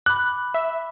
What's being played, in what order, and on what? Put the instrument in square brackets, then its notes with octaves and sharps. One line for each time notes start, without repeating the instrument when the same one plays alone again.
[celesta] B5 D6 [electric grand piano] F#6
[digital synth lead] E5